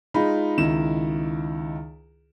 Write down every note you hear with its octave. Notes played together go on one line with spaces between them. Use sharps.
G#3 D#4 F4 B5
C#2 D#3 E4 E7